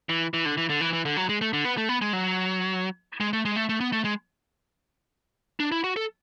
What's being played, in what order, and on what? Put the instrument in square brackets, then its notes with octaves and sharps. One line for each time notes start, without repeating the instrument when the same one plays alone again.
[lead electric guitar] E3
E3
D3
E3
D3
E3
E3
D3
F#3
G#3
A3
D3
B3
A3
B3
G#3
F#3
G#3
A3
G#3
A3
A3
B3
A3
G#3
D4
E4
F#4
A4